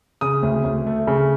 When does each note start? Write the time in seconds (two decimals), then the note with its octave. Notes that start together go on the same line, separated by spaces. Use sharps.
0.21 C#3 D#6
0.43 D2
0.64 D2
0.87 A3
1.07 C#3